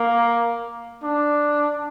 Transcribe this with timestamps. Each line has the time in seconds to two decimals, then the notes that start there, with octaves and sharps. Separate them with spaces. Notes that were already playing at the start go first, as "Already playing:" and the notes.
Already playing: A#3
1.03 D4